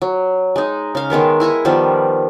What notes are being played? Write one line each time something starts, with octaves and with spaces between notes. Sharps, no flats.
F#3
G#3 D#4
C#3 F5
D#3 G#3 B3 A#4
E4 G#5 A#5 C#6
D#3 F3 G3 B3